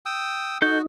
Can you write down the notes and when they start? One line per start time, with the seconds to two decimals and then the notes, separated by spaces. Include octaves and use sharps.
0.06 G5 D#6 E6
0.62 D#4 F#4 A4 G6